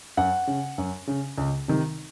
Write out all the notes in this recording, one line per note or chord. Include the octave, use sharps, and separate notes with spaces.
F#2 F#5
C#3
F#2
C#3
C#2
C3 D#3